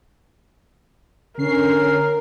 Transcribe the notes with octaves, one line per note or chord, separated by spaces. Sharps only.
D3 C#4 A#4 C7